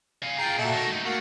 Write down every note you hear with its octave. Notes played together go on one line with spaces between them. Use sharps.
F5 G#5
F4 G#4 G5 A#5
A#2 F#4 A4 E5
D#3 D#4
A3 D#4
A3 A#3 F#4